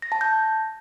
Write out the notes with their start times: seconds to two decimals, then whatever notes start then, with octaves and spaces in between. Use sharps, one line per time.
0.02 A#6
0.12 A5
0.21 G6